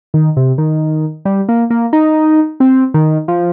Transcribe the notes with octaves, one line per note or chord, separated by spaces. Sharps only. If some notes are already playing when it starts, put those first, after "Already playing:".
D#3
C3
D#3
G3
A#3
A#3
D#4
C4
D#3
F3